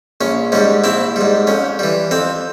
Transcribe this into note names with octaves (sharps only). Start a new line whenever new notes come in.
A#1 C#4
G#2 G3 C#4
A#1 C4 E4
G#2 G3
F2 C#4
E3 G3
F2 C4